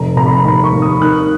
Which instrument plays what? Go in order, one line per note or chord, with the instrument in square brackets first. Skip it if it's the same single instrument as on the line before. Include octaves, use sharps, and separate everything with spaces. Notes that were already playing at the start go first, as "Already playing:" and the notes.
Already playing: [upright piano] F1 A#5
F1 A#5
B5
A#5
D#2 B5
C#6
D#2
D#6
D#3 F#6